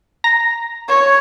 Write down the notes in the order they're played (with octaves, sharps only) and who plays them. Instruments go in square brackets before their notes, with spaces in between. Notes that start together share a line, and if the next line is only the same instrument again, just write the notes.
[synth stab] A#5 A#6
[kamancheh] C#5